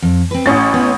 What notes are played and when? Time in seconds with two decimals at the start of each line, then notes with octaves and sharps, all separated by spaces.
0.02 F2
0.31 C4 B4
0.46 A1 C#4 F#4 A6
0.74 B3